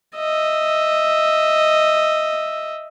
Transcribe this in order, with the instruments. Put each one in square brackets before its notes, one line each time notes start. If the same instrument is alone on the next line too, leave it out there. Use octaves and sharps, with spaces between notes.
[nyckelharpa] D#5 E5